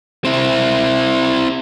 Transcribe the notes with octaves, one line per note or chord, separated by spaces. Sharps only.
C4 E4